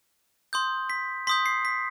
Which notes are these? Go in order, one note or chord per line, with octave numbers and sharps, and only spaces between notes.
C6 D#6 G6
B6
C6 D#6 G6 B6
C7
B6